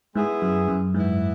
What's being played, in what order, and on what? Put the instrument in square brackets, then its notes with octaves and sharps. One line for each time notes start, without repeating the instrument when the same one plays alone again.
[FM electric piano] G#2 [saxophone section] G#3 B3 E4 G#4
[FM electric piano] F#2
F#2
[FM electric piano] G#2 [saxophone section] E3 B3 E4